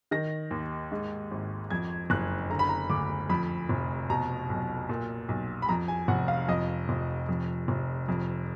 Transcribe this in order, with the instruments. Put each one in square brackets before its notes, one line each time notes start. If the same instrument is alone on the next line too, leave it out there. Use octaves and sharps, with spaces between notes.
[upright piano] D#3 A#6
D#2
G#2
G#1
F2 G#6
F#1 F#6
D3 A#5
B5
A#5
D2 D6
F2 B5
F1
B2 A#5
B1
A#2
B1
B5
F2 A#5
G#5
F1 F#5
F5
F2 D#5
F1
F2
F1
F2